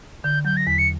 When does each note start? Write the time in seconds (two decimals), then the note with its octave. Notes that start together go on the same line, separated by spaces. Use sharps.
0.24 D3 G6
0.45 F#3 G6
0.57 A#6
0.67 E2 B6
0.78 C#7